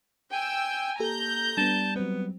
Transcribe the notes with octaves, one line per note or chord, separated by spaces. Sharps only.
G5 G#5 E6
A#3 G4 A4 A#5 G6
G3 B3 D4 A5
F#3 B3 C4